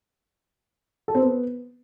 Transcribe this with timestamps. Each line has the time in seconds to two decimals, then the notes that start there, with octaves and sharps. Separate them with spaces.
1.08 A4
1.15 C4
1.21 B3